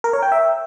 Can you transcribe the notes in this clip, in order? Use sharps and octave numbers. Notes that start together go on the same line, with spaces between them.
A#4
C#5
G5
E5